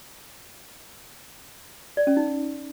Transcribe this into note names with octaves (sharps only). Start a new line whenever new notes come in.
D5
C#4
D#4